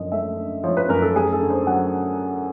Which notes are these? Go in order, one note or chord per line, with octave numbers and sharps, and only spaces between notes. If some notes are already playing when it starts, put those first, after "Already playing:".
Already playing: F#2 D3 F3 D#5
A3 E5
D3
F3 C#5
B4
F#2 A#4
A4
A3 G#4
A4
D3
C5
F#3 F#5